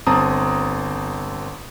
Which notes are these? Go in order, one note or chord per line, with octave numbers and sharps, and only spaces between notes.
G1 C4 A5 A#5 D#6